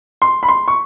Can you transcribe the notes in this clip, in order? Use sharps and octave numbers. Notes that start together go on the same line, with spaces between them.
C6
B5
C6
C#6